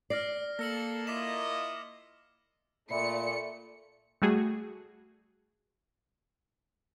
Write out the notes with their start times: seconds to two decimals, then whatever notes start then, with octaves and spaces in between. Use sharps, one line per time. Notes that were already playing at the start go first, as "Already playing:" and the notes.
0.10 D5 F6 A#6 C7
0.59 A#3 A4 A#6 C#7 F#7
1.07 E4 F4 D#5 D6 B6 E7
2.90 A#2 A3 D5 E5 B5 C#7
4.22 G3 A3 F#4 G#4